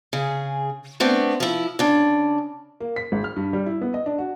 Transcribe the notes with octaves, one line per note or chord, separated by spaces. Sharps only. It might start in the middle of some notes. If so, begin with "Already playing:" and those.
C#3 G#4
A3 B3 C4 D4
F3 E4
C#3 D4
A#3
B6
G#1
F6
G2
G3
E4
B3
D#5
D4
F#4